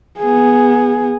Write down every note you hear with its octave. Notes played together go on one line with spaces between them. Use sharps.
B3 G#4